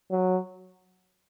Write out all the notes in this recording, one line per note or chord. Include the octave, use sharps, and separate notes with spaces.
F#3